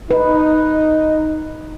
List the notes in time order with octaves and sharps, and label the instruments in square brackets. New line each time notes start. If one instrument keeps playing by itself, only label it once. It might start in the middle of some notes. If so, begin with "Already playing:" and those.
[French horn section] D#4 [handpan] B4